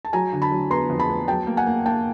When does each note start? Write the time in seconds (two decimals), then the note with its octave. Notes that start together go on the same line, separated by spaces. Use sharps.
0.05 A5
0.13 F#3 G#5 A#5
0.33 D3
0.42 A5 B5
0.52 F#3
0.71 B3 A#5 C6
0.90 F2
1.00 A5 B5
1.09 B3
1.28 F#3 G5 A5
1.47 A#3
1.57 F#5 G#5
1.66 A#3
1.86 A#3 G5 A5